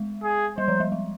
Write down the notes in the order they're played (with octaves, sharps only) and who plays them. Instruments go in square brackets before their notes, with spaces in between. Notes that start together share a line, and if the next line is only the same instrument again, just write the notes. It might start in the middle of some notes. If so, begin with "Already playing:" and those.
Already playing: [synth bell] G#3
[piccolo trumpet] G#4
[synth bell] G3 [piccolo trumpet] C5
[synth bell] F3
G3
G#3